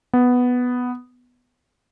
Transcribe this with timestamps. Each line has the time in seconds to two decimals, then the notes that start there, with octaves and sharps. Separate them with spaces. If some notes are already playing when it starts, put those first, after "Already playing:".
0.13 B3